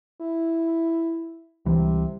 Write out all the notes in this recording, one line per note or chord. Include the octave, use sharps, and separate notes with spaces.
E4
C#2 C3 E3 G3